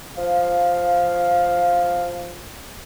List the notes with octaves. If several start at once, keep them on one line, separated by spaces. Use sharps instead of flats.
F3 F5